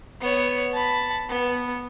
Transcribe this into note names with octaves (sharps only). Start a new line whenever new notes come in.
B3 C#5
A5 B5
B3